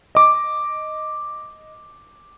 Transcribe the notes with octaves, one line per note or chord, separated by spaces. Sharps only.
D#5 D6